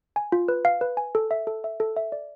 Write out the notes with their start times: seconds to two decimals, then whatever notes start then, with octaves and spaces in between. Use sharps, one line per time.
0.16 G#5
0.32 F4
0.48 B4
0.65 F5
0.81 B4
0.97 G#5
1.15 A4
1.31 E5
1.47 A4
1.64 E5
1.80 A4
1.96 E5
2.12 D5